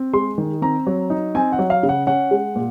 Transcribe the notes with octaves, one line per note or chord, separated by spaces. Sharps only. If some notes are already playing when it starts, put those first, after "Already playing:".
Already playing: C4
G#3 C6
D#3
C4 A#5
F#3
D#4
C4 G#5
F#5
F#3
F5
C#3
F#5
C#4 F#5
G#3
A#2